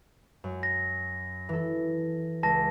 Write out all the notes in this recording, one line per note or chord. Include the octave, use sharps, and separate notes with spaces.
F#2
A#6
E3 A4
C#2 A5 A#6